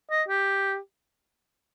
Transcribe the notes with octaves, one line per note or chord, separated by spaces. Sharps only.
D#5
G4